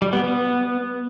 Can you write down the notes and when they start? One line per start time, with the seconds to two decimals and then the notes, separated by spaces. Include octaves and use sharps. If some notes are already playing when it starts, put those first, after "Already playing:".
0.02 G3
0.13 B3
0.24 B3